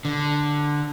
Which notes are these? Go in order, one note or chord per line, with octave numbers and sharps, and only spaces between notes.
D3